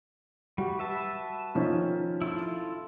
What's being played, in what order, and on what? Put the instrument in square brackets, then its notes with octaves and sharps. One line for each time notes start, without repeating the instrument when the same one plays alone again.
[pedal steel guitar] G3 [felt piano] F#4
[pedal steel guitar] B4 E5 A5
[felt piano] D#3 F3 C#4
[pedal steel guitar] E4 F4 A4